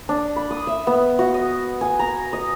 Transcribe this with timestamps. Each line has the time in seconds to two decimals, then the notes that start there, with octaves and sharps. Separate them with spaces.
0.09 D4
0.36 B5
0.51 D#6
0.67 E5
0.87 B3
1.19 F#4
1.34 D#5
1.81 G#5
1.99 A#5
2.33 D#5